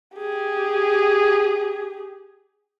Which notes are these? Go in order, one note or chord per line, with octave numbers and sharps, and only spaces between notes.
G4 G#4